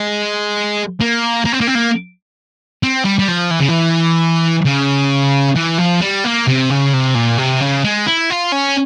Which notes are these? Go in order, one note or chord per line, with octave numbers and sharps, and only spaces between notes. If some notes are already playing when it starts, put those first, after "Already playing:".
Already playing: G#3
A#3
A#3
C4
A#3
C4
A#3
C4
G3
G3
F3
E3
C#3
E3
C#3
E3
F3
G3
A#3
C3
C#3
C3
A#2
C3
C#3
G#3
E4
F4
C#4